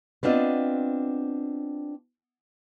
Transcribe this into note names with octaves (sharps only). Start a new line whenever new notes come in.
B3 C4 D4 F4 D#5